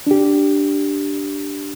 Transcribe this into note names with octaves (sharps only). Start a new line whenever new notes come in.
D4 G4